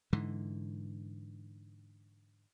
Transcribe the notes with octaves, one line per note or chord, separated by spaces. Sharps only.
G#2 D3 E3